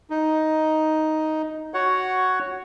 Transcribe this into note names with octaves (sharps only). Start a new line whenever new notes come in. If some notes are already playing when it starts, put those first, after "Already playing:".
D#4
F#4 C#5 F#5